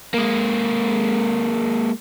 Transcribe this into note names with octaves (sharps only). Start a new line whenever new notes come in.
G#3 A#3